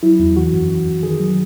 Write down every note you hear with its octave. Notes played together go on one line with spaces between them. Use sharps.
F#3 E4
E2
E3 F#4
F#2
E3
F#2
D#3 G#4
F#3